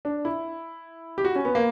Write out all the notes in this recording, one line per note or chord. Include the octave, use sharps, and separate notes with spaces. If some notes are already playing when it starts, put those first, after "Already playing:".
D4
E4
G4
F#4
C#4
B3
A#3